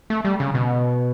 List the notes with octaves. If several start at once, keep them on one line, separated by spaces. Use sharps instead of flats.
A3
G3
C#3
B2